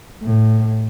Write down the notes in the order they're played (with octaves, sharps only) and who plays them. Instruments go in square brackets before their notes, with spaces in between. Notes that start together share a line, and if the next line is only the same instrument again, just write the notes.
[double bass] A2